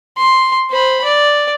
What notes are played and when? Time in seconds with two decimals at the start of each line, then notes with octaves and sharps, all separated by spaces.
0.17 C6
0.70 C5 B5
1.04 D5